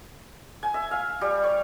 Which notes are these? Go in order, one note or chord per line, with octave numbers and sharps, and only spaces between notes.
G#5
E5
F5
G3
C#5